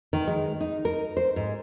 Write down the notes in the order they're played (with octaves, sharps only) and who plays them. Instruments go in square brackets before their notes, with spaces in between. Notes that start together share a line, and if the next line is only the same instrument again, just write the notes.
[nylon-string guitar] D#3
G#3
D#4
A#4
C5
G#2